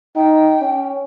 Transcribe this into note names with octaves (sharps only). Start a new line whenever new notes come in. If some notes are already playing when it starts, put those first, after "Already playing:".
D#4 G5
C#4